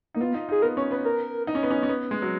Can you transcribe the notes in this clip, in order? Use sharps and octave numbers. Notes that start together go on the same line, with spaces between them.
A#3 D#4
B3 F4
D#4
D#4 G#4
B3 A#4
C#4 C#5
B3 B4
A#4
D#4
C#4
B3
C#4
C#4
B3
G#3
F#3